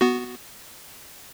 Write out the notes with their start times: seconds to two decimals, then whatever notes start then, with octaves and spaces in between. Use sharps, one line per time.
0.01 B3 F#4